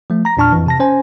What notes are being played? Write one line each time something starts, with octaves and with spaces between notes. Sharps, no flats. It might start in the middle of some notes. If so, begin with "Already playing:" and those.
F3 A3
A#5 A#6
E2 A#2 D4 A5 C#6 F6
F2 E3
C3 A5 A#6
C#4 C5 G#5